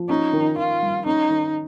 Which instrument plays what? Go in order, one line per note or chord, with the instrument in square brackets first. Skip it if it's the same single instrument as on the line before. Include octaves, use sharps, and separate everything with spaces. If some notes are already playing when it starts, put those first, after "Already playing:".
Already playing: [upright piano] F3
[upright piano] C#4 [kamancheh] D#4
[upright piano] D#3
[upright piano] D#3 [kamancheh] F4
[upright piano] G3
[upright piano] C#4 [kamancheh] D#4
[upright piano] D#3